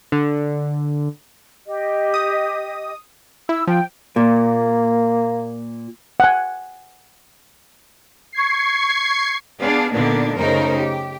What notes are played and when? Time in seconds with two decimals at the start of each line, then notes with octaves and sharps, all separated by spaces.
0.12 D3
1.66 G4 D#5
2.14 D#6
3.49 E4 E6
3.67 F3 G5
4.16 A#2 A#3
6.20 F#5 G#5
8.32 C#6 G#6 C7
9.59 B3 D4 G#4 F5
9.92 A#2 D3 A#3 B3 D4 D#4
10.37 F#2 C#3 A3 D#4 A#4 C5
10.76 G4